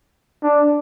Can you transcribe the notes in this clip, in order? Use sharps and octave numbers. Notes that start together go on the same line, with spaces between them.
D4